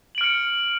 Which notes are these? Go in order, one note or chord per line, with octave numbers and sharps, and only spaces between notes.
F6 C#7 D7 F#7